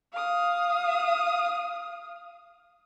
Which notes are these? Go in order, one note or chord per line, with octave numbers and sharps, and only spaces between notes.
F5 D#6